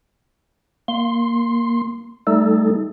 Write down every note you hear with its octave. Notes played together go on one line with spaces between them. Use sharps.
A#3 C6
G3 A3 D#4 A4